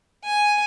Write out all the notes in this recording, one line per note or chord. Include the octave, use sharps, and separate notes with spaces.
G#5